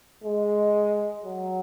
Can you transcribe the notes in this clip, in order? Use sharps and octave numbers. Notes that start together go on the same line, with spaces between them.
G#3
F#3